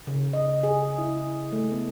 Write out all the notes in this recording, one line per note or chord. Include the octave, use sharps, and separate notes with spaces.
C#3
D#5
G#4
E4
A3
B3